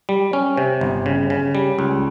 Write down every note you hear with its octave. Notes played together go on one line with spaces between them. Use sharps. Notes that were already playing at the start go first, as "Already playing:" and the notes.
G3
C#4
C3
G1
C#3
C#3
G3
C#2